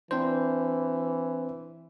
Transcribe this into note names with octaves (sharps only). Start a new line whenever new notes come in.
E3 C4 D4 C5